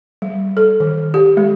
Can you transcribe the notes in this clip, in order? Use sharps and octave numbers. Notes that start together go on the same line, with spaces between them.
G3
A4
D#3
G4
G#3